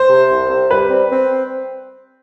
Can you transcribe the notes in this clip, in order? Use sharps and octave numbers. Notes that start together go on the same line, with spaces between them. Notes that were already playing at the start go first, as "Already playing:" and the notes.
Already playing: C5
C3
C2
C3
G3 B4
C4
C4